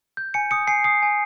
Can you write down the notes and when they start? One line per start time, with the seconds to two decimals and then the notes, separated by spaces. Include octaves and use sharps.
0.17 G6
0.34 G#5 C#7
0.51 D#6 C#7
0.67 G#5 C7
0.84 D#6 C7
1.02 G#5